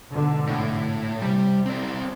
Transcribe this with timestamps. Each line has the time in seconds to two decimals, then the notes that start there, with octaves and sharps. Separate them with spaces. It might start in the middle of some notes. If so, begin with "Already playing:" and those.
0.11 G#2 B2 D3
0.47 A2
1.22 C3 G3
1.66 C4 D5